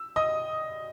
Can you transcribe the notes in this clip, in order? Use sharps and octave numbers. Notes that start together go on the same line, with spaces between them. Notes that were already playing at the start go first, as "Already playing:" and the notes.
Already playing: E6
D#5 D#6